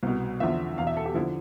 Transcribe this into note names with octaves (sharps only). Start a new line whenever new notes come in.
C2 B2
E2 D3 F3 E5
E2 B2 F5
E5
A4
G4
D3 F3 E4